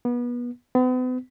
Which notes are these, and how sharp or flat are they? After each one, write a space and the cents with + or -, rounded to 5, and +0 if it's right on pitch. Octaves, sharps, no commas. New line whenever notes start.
B3 -30
B3 +40